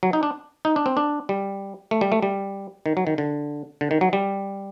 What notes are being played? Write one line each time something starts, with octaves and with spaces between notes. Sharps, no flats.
F#3
D#4
D4
D#4
D4
C4
D4
G3
A3
G3
A3
G3
D#3
F#3
D#3
D3
D3
D#3
F#3
G3